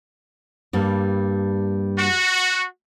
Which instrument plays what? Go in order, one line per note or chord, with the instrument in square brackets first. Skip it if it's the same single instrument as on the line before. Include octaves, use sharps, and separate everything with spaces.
[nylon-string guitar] G2 G3 A#3
[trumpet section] F#4